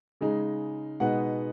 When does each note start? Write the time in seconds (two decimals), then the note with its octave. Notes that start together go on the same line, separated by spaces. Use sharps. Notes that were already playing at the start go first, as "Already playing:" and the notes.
0.21 C#3 G#3 D#4
1.00 B2 G#3 B3 D#4 F#5